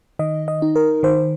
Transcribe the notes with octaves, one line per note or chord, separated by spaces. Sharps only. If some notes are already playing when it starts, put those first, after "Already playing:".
D#3 D#5
D#5
D#4
A#4
D#3 C5